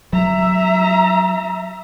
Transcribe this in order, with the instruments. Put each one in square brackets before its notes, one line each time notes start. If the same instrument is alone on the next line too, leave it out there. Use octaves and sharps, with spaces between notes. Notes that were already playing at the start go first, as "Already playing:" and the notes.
[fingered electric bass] F#3 [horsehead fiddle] E5 A#5